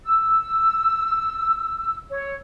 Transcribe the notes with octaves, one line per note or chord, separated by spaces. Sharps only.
E6
C#5